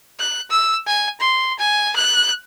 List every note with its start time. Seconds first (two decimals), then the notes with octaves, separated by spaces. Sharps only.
0.20 F#6
0.51 E6
0.87 G#5
1.20 C6
1.59 G#5
1.96 F#6